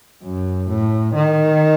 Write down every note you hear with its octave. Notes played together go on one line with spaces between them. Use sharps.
F#2
A2
D#3